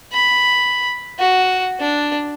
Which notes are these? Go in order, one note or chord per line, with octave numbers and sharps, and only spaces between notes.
B5
F#4
D4